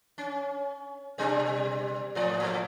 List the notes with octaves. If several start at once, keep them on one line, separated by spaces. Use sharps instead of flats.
C#4
B2 G3 D4
G#2 F3 D5
A2 F3 A3